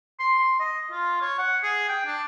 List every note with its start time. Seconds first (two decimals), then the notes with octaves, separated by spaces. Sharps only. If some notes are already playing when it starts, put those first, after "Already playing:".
0.19 C6
0.38 C6
0.60 D#5
0.91 F4
1.21 C#5
1.38 F#5
1.62 G#4
1.88 G5
2.06 D4